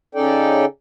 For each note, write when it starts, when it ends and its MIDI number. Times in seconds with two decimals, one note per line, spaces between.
0.15 0.65 49
0.15 0.65 61
0.15 0.65 63
0.15 0.65 69
0.15 0.65 74
0.15 0.65 79